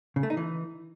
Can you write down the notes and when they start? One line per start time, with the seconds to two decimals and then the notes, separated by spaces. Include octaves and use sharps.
0.16 C#3
0.23 A3
0.30 D#4
0.37 E3